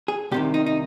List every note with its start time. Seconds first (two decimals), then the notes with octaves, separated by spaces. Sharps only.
0.08 G#4
0.31 C2 C3 D#3 G4
0.54 D#4
0.66 D#4